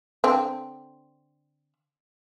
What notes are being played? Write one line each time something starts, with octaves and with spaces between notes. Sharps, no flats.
D3 C4